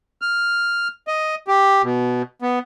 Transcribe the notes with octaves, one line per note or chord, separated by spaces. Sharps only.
F6
D#5
G4
B2
B3